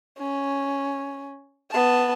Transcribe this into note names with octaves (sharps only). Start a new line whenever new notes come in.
C#4
B3 A5